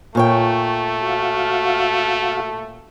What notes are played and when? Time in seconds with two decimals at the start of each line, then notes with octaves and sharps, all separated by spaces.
0.15 A#2 A3 C#5 G5
1.02 F#4 F5